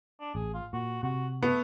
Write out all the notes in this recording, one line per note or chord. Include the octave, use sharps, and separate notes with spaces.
D4
A1 G#4
F4
A#2 F#4
C3 F#4
A3 B3